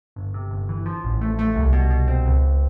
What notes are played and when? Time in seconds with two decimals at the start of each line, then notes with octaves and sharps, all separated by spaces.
0.16 G1
0.34 C3
0.51 G1
0.69 E3
0.86 F3
1.03 A1
1.21 A3
1.39 A3
1.56 C2
1.73 B2
1.90 B2
2.08 C4
2.26 C#2
2.43 C#2